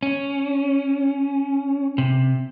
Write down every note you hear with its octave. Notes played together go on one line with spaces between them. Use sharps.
C#4
C3